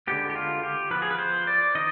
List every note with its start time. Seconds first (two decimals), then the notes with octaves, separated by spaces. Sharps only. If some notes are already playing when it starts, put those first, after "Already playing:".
0.07 D3 G#3 B3 G4
0.30 G4
0.35 F4
0.63 G4
0.91 F3 B3 B4
1.02 G#4
1.11 B4
1.19 C5
1.47 D5
1.75 D#3 D#5